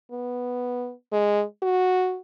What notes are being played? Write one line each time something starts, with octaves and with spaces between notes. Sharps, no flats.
B3
G#3
F#4